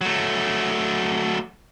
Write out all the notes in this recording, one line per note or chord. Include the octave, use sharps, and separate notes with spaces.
F#3 A3